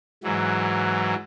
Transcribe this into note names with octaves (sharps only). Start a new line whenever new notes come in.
G#2 E3 F#3